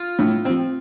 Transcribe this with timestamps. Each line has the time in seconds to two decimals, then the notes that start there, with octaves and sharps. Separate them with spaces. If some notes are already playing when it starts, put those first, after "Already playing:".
Already playing: F4
0.19 A2
0.45 F3 C4